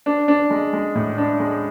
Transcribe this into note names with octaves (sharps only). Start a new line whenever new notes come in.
D4
D4
G#3
G#3
A2
D4
G#3